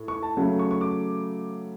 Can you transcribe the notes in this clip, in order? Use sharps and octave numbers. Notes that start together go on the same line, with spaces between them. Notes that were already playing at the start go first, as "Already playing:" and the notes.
Already playing: A2
C#6
A5
C#3 F#3 A3
C#6
C#6
D6